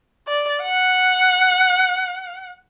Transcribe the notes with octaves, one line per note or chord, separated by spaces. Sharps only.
D5
F#5